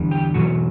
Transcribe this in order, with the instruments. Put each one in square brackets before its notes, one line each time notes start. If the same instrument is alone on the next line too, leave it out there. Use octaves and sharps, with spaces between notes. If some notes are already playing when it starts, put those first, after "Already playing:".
Already playing: [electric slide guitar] E2 D3 G3
G4
E2 B2 F#3 F#4